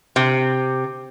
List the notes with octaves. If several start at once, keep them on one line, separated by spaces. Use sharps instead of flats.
C3